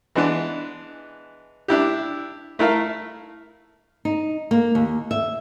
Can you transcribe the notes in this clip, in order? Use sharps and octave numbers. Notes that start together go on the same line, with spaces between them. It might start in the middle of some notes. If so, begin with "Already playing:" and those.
E3 G#3 B3 D4
D4 E4 G4
A3 E4 A#4 F5
D#4
A#3
D#2
E5